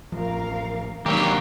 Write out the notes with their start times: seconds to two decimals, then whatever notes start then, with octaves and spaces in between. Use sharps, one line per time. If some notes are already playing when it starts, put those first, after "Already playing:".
0.12 A1 F2 F3 A#4 F5
1.06 C3 D#3 F#3 A#3 D4 D#4 G4